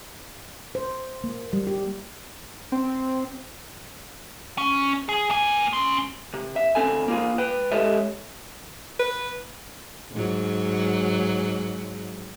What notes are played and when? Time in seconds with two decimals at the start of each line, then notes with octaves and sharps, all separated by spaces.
0.75 C5
1.24 A#3
1.53 G3
1.67 G4
2.72 C4
4.58 C#4
5.09 G#4
5.30 A#3 G#5
5.73 C#4 C6
6.34 C3
6.56 E5
6.75 D2 C4 A4 G#5
7.08 A#3 F4 G4 G#4
7.38 B4 G5
7.72 G#3 G4 A4 C#5 D#5 E5
8.99 B4
10.12 G#2 F#3